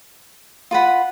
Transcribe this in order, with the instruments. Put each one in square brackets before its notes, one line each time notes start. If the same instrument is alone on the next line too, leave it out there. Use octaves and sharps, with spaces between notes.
[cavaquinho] F4 B4 F#5 B5